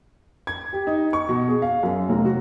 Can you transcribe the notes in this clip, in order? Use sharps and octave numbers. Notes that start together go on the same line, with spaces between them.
G#6
G4
D#4
C#6
B2
G#4
F5
F#2
F1
F#4